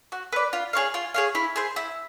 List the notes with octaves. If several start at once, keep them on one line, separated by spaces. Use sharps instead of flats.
F#4
B4 D5
F4
G#4 C#5 F5
F4
G#4 C#5 F5
E4
G#4 C5
E4